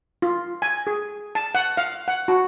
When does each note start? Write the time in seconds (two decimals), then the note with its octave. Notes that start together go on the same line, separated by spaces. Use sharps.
0.22 F4
0.62 G#5
0.87 G#4
1.35 A5
1.55 F#5
1.77 F5
2.08 F#5
2.28 F#4